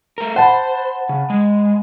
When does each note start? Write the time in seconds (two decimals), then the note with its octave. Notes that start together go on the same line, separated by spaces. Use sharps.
0.18 A3 A#4
0.36 C5 F#5 A5 B5
1.09 C#3
1.30 G#3